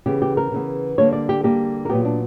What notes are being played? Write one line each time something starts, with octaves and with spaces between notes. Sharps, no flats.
C#3 E3 B3 G4
G4
A#4
C#3 E3 B3
D3 G3 A#3 C#5
D5
G4
D3 G3 A#3 G4
A#4
A#2 F#3 B3 G4
D4